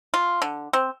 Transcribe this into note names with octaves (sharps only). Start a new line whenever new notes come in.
F4
D3
C4